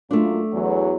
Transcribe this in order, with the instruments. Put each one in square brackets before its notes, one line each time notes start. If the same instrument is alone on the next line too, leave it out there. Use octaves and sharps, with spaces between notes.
[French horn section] F#2 A#3 F4 [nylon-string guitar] A3 D4
[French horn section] E2 F#3